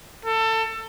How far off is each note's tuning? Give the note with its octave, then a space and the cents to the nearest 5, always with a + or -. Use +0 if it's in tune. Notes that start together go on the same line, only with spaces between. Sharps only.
A4 +25